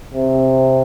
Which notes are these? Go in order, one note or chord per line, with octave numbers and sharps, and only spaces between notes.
C3